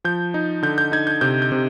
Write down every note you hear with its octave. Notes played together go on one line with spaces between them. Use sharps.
F3 G6
D#4
D3 G6
G6
D#4 G#6
G6
C3 G6
G6
C3